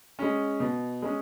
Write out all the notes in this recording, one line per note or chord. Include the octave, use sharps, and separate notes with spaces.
G#3 C#4
B2
G#3 C#4